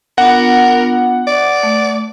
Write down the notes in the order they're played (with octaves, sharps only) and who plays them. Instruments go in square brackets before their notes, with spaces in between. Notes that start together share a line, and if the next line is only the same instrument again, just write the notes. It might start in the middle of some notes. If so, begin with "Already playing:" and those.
[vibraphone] B3 D4 F4 [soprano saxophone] A#4 [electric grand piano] F#5
[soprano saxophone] D5
[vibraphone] A3